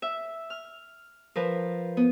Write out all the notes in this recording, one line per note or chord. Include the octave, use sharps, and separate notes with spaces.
E5
F6
F3 A#4 B4
B3